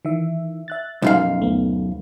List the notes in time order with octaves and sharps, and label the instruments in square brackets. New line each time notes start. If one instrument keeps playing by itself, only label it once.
[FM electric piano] D#3 E3 E5
E5 F#6 A6
[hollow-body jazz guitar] B1 F#2 F5 [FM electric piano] F3 D#4
[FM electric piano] D2 A3 B3